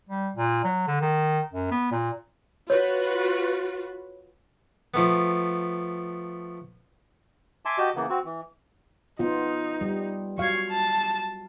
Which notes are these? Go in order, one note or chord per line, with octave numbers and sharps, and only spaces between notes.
G3
A#2
F#3
D3
D#3
F#2
B3
A#2
F4 F#4 B4 C#5
F3 A3 B3
E5 G#5 A5 C6 D6
F#4 G4 D#5 A5
C#3 E3 A#3 B3
C4 F#4
E3
B3 D#4 F4
G3
F#3 F5 C#6 G#6
A5